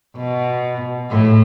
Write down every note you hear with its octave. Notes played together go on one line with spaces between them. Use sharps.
B2
A2